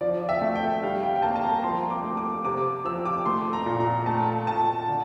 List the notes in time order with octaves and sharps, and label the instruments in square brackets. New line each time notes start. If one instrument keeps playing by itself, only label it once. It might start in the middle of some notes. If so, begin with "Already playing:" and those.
[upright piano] F3 D5
E5
A3
G5
G3 F5
G5
G5
A#3 A5
A5
A#5
A#5
F3 C6
D6
A3
D6
C3 D6
F3 E6
D6
A3 C6
A#5
A#2
A#5
A3 A5
A#2 A5
D3